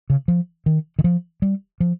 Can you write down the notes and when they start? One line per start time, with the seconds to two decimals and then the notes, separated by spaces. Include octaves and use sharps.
0.10 C#3
0.28 F3
0.66 D#3
0.99 D#3
1.04 F3
1.42 G3
1.80 F3